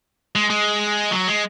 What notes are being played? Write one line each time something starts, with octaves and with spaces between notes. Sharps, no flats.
G#3
G#3
F#3
G#3